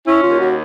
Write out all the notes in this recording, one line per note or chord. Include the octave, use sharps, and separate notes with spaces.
C#4 E4
F4
D#2
F#4